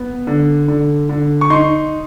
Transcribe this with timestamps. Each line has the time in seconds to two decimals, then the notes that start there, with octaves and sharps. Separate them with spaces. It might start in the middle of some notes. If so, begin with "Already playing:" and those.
Already playing: B3
0.27 D3
0.68 D3
1.09 D3
1.41 C#6
1.50 D#4 C6